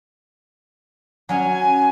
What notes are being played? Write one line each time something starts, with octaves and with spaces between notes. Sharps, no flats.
F#3 C#4 G#5